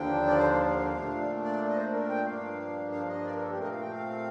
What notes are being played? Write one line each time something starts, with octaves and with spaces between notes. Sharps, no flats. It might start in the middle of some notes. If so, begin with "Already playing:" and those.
Already playing: D#2 D3 F3 A#3 D4 G5
D5
C5
F5
A#2 A3 D4
D5
D#5
C5
A#4
G5
G2 F3 A#3 D4 F5
F5
D#5
D5
A#4
A4
G4
A#2 A3 C4 A#4
D#5
F5
G5
F5